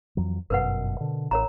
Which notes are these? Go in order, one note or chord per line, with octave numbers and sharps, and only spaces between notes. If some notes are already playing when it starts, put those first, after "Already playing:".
F2 E3 F#3
G1 F#2 B2 A#4 B4 F#5
B2 D3
A1 A#4 C#5 A#5